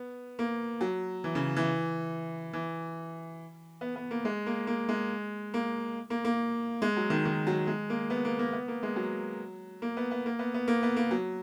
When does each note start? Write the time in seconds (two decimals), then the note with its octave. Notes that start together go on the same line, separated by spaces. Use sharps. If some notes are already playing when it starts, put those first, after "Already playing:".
Already playing: B3
0.39 A#3
0.81 F#3
1.24 E3
1.35 C#3
1.56 E3
2.53 E3
3.81 B3
3.96 B3
4.11 A#3
4.25 G#3
4.46 A#3
4.67 A#3
4.89 G#3
5.54 A#3
6.10 A#3
6.25 A#3
6.82 G#3
6.97 F#3
7.10 D#3
7.25 D#3
7.47 F#3
7.67 G#3
7.90 A#3
8.10 B3
8.25 A#3
8.39 A#3
8.53 B3
8.68 A#3
8.83 G#3
8.96 F#3
9.82 A#3
9.97 B3
10.11 B3
10.26 A#3
10.39 B3
10.54 B3
10.68 A#3
10.83 B3
10.96 A#3
11.11 F#3